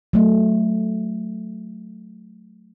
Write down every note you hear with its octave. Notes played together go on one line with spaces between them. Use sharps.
F#3 A3